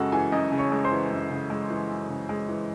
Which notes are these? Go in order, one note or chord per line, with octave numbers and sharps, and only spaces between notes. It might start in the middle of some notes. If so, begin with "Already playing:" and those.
Already playing: F#2 C#3 G#3 F#4 A4 F#5 G#5
E3 G#4 G#5
F#2 D#5 D#6
C#3
C#5 C#6
G#3
C5 C6
E3
F#2
C#3
G#3
E3
F#2
C#3
G#3
E3